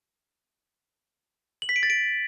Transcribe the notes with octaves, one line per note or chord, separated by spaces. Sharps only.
F#7
B6
D7
A6
D7